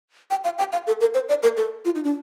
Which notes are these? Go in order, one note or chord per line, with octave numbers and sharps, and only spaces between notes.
G5
F5
G5
F5
A4
A#4
C5
D5
A#4
A4
F4
D#4
D4